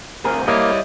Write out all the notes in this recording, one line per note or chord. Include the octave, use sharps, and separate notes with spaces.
D2 C4 G#4 A#4
G3 A#3 E4 C#5 D#5